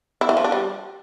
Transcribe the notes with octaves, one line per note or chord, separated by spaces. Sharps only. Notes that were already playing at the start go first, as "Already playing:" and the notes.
E4
E3
F3
D4
G3